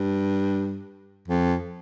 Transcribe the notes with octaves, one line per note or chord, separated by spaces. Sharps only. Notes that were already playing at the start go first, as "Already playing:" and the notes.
Already playing: G2
F2